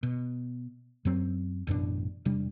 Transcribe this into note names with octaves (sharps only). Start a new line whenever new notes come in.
B2
F#2 F#3 C4
A1 F#2 B2 D4
E1 C3 G3 D4